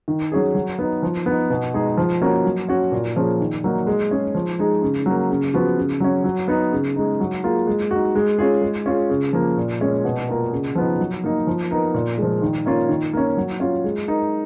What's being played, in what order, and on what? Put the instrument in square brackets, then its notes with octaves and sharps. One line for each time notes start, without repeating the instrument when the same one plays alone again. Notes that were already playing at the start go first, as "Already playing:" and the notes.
[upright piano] D#3
F#3 C#4 G#4
F#3
B3 D#4
F3
B3 D#4
B2
G#3 D#4 G#4
F3
A#3 C#4 F#4 A#4
F#3
C#4 F#4
A#2
F3 A#3 C#4 G#4
D#3
F#3 A#3 D#4
G#3
C#4 G#4
F3
G#3 D#4 G#4
C#3
F#3 A#3
C#3
F3 B3 F#4
C#3
F#3 C#4
F#3
B3 D#4
C#3
G#3 D#4
F#3
A#3 F4 G#4
G#3
D#4 F#4
G#3
C#4 F4 G#4
G#3
C#4 F4 G#4
C#3
F3 A#3
A#2
G#3 C#4
B2
A#3 F4 A#4
C#3
F3 B3 D#4
F#3
A#3 D#4
F3
B3 D#4 A#4
A#2
F3 G#3
D#3
A#3 C#4 F4
D#3
A#3 C#4
F#3
C#4 F4
G#3
D#4 A#4